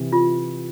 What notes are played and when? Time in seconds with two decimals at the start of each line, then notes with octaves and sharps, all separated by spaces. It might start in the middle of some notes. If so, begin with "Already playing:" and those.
Already playing: C3 E3
0.12 F4